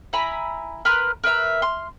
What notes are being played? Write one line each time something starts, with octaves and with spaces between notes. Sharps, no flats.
E4 G#5 A#5 B5
A#4 B4 A#5 C6
A#4 B4 E5 A#5
C6 F6